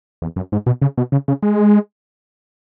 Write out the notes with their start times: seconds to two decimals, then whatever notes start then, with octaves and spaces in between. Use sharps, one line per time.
0.22 E2
0.36 F#2
0.52 G#2
0.66 B2
0.82 C#3
0.98 B2
1.12 C#3
1.28 C#3
1.42 G#3